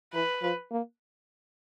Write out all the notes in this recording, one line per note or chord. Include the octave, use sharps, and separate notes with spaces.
E3 B4
F3
A#3